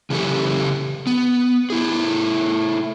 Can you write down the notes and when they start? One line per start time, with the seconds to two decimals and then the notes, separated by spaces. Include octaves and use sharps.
0.10 C#3 E3 G4 A4
1.07 B3
1.70 A3 E4 G#4